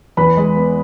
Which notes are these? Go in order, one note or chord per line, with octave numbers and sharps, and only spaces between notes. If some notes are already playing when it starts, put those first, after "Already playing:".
E2 B4 B5
G#3
B3